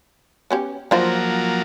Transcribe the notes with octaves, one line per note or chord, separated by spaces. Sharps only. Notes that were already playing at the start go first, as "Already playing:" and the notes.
B3 C#4 G4
F3 F#3 A#3 D4 F4 C5